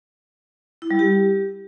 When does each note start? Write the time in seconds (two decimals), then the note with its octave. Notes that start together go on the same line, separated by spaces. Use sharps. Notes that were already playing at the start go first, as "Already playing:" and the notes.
0.82 E4
0.91 G3
0.99 G4